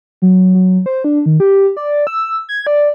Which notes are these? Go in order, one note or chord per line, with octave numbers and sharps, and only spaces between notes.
F#3
F#3
C5
D4
D#3
G4
D5
E6
G#6
D5